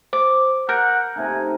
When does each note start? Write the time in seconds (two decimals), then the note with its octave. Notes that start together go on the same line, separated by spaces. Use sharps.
0.13 C5 D6
0.69 A#4 F#5 F6 G6 A#6
1.16 C3 A3 D#4 G#5